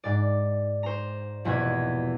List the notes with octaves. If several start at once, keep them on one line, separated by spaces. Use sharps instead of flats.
G#2 D5
C5 A#5
F1 E2 B2 A#3 B4 G#6